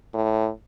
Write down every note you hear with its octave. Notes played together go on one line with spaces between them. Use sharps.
A2